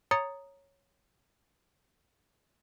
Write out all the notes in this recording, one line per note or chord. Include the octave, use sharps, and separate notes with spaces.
C#5 A#5 D#6 A6 C#7